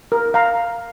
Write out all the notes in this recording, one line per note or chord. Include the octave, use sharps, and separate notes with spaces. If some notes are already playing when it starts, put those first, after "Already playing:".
A#4
F5 A#5